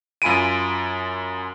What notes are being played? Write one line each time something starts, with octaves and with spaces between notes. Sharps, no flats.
F#2 F4 G#5 B5 D7 D#7